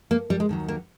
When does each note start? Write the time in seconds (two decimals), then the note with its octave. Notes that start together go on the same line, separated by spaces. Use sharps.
0.11 A#3
0.30 G3
0.40 G#3
0.49 D#2 D#3 F#3
0.68 A#3